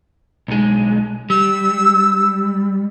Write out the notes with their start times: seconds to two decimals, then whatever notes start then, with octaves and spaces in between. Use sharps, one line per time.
0.48 B1 G#3
1.30 G3 E6